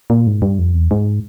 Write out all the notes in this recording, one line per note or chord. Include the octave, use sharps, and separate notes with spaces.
A#2
G#2
G2
F2
E2
G#2